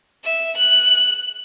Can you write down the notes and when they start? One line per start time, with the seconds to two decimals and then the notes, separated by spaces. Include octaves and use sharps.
0.24 E5
0.57 F#6